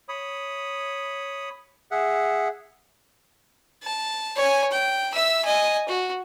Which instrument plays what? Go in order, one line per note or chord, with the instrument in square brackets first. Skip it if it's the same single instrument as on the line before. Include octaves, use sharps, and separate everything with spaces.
[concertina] C#5 B5 D#6
G#4 E5 F#5
[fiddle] A5
C#5 G#5
G5
E5 E6
D#5 G#5
F#4